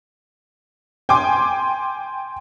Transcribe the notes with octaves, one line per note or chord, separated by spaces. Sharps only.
G5 G#5 C6 D6